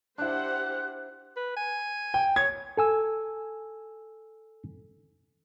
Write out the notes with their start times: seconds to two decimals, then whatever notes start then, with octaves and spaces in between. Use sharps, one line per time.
0.18 D4 E4 G4 C5 F#5 F#6
1.37 B4
1.57 G#5
2.14 G5
2.36 C#5 G#6
2.77 A4 G#5 E6